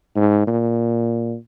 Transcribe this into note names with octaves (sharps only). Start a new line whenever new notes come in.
G#2
A#2